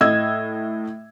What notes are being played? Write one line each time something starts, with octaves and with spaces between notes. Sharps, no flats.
A2 D#5 E6 G#6